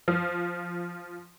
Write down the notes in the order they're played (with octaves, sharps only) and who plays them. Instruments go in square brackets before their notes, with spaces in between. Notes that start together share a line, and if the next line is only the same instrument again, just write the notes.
[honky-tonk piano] F3